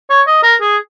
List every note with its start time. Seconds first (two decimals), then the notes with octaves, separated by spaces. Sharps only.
0.10 C#5
0.27 D#5
0.43 A#4
0.61 G#4